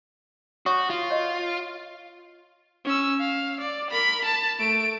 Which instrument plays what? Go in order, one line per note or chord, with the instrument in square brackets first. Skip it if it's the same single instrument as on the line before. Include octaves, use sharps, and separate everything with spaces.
[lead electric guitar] F#4 [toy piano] C#5 C#6 D#6
[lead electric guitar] F4
[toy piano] C#5 D#5
[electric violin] C#4 E6
F5
D5
A#4 B5
A5
A3 D7